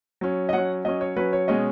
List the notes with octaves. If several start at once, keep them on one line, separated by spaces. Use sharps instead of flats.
F#3 C#4
D#5
F#3 C#4 F#5
F#3 C#4 D#5
C#5
F#3 C#4 B4
C#5
B2 G#3 C#4 D#5